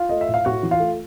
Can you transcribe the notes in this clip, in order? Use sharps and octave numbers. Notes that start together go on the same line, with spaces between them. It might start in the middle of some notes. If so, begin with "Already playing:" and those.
Already playing: F4 F5
A3 D#5
E5
A2
F5
A2 F#4 F#5
E3
F4 F5
A3